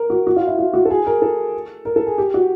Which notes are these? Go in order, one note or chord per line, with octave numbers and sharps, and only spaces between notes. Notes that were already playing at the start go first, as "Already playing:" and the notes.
Already playing: A#4
F#4
F#4
F4
E4
F4
F#4
A4
G#4
A#4
A4
A#4
A4
G#4
G4
F#4